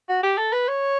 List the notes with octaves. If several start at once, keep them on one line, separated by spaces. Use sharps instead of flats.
F#4
G4
A4
B4
C#5